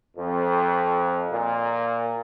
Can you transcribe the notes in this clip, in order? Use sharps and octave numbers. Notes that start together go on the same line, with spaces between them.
F2
A#2